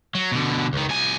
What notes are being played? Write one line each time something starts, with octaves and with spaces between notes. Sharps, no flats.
F#3
B2 D3
C#2 D#3
C2 G#5